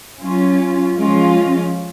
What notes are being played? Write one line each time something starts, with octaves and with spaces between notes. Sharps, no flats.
F#3 C#4 F4
F3 G#3 C#4 F4